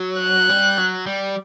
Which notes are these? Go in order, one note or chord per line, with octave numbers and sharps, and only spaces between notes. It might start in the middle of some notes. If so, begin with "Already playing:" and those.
Already playing: F#3
F#6
G3
F#3
G3